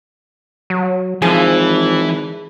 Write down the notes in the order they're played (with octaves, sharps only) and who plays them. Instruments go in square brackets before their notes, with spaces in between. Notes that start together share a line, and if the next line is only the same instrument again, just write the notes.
[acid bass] F#3
[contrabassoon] G#1 [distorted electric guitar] E3 [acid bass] F3 [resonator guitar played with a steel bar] G#4